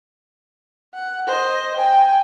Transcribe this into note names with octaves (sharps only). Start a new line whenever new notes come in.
F#5
C5 D#5
G5 G#5